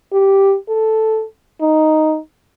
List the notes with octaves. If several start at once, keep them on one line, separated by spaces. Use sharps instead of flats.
G4
A4
D#4